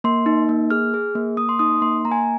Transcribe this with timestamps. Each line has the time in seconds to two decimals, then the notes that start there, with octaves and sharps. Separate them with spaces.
0.04 A#3 C6
0.26 D#4
0.49 A#3
0.70 G#4 F6
0.94 G#4
1.15 A#3
1.37 A#3 D#6
1.49 C6
1.59 D#4 D#6
1.82 A#3 C6
2.05 A#3 A#5
2.11 G#5